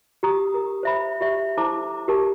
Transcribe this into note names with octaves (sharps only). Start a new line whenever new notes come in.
G4 A#5 D#6
A#4
C5 E5 B5
G4 E5
E4 A4 C5 A5 A#5 D6
G4 A#4 A5